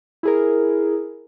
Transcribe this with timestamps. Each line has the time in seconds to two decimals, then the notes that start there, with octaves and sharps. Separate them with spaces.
0.23 E4 G#4 A#4